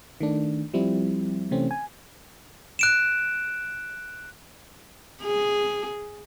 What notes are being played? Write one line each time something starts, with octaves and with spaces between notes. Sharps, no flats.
D#3 A3 D4
F3 G3 C4 E4
C3 E3 A3 C4 C#4
G#5
F#6 D7 E7
G#4